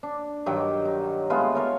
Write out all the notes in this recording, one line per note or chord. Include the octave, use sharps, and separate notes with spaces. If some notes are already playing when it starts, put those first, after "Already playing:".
D4
G2 D#3 F#3 G5
D#4
G#3 A3 B3 F4
F4 A#4 C#5